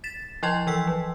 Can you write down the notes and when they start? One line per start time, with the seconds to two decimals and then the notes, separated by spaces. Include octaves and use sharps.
0.04 A6 B6 E7
0.43 F3 E4 D#5 G5 C6 G#6
0.67 E3 F3 G5 E6 B6
0.87 F#3